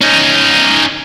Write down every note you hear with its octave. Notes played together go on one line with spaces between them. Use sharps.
C#4 D#4